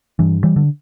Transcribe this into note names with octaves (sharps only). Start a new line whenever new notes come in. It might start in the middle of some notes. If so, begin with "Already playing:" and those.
G2 E3
E3 G3
D3